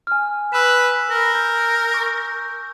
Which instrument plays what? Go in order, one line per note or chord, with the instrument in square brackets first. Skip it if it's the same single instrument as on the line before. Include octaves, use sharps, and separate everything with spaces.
[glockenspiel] G#5 F6
[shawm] B4 [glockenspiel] E6 E7
[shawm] A#4
[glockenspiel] G6
C#6 D6 G6